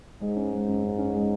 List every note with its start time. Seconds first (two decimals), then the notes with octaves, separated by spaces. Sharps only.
0.21 G#2 G#3
0.36 C#4
0.52 G#3
0.68 F#2
0.83 F#2
0.99 C#4
1.14 G#3